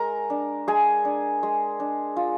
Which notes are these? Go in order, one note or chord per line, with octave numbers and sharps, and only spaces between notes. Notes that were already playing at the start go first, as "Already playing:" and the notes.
Already playing: G#3 A#4 A#5
D4
G#3 G#4 G#5
D4
G#3
D4
F4